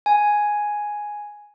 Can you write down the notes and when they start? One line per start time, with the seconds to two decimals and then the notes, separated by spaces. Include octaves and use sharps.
0.06 G#5